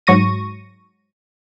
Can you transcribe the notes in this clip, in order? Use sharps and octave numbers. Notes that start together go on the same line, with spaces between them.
G#2 F#3 C#6 A#6 D#7